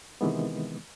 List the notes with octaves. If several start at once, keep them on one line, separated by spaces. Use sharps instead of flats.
C3 D#3 E3 G#3 B3